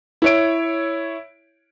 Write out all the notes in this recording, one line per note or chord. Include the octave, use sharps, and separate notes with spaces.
E4 C#5 D7